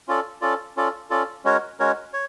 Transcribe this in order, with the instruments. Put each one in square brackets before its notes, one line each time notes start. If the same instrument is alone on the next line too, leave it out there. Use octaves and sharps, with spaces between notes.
[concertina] C#4 F4 A4 D5
C#4 F4 A4 D5
C#4 F4 A4 D5
C#4 F4 A4 D5
G#3 C#4 F#4 A#4 C#5
G#3 C#4 F#4 A#4 C#5
C#5